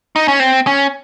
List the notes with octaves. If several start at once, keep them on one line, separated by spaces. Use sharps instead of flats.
D#4
C#4
C4
C#4